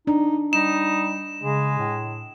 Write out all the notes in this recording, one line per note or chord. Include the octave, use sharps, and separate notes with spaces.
D4 D#4
G3 D#4 E7
C#3 G#3
A2